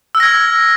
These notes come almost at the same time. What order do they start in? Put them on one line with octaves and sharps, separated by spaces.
E6 F6 A#6 G#6